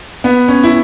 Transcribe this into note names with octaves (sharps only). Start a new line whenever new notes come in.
B3
C#4
E4